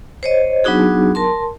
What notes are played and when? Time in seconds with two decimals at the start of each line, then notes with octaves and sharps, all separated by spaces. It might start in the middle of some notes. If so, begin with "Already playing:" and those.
0.23 C5 C#5 D#5
0.64 F#3 B3 D4 D#4 F#4 G#4
1.15 A#4 A5 C6